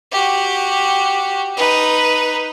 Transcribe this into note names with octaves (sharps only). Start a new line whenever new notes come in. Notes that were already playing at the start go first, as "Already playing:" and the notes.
F#4 G4
D#4 B4